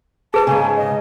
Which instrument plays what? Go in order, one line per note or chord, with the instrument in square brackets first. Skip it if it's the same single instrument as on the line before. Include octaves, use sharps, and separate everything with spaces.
[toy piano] G#4 B4 [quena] A5
[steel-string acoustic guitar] G#2 C#3 [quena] G#5
[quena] D#5